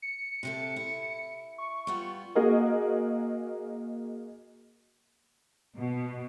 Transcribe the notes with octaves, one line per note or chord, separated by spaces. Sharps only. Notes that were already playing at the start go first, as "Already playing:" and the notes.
C#7
C3 G4 A4
E4
C#6
G3 B3 F4
A#3 F#4 G#4 A#4 D#5
B2